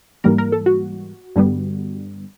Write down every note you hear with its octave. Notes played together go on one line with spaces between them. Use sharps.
G#2 E3 G3 A#3 A#4
A#4
A4
F#4
G2 D3 G3 B3